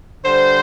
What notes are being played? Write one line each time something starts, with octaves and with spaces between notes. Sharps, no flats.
D3 G3 C5